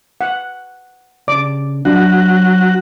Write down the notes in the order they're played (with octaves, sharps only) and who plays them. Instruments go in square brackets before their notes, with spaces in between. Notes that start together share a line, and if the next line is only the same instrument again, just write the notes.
[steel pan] F#5
[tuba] C#3 [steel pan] D5 D6
[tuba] F#3 [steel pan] D4 [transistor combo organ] F#4